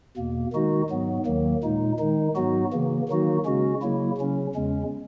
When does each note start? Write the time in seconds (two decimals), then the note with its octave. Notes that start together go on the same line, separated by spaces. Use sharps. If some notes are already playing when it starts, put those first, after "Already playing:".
0.17 E2 B2 A#3
0.53 D#3 G#3 D#4 F#4
0.90 G#2 F#3 B3
1.26 D#2 D#3 F#3 A#3
1.63 A#2 G#3 D#4
1.99 D#3 G#3 D#4
2.36 G#2 F#3 B3 D#4 F#4
2.72 C#3 E3 A#3
3.08 D#3 F#3 A#3 D#4 F#4
3.45 C#3 G#3 C#4 F#4
3.82 C#3 F#3 A#3 E4
4.17 C#3 F#3 C#4
4.55 E2 C#3 G#3 C#4